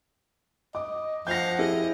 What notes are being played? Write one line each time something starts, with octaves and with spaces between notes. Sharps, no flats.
D#5 D6
F3 F5 F#5 G6 A#6
E4 G4 G#4 D#5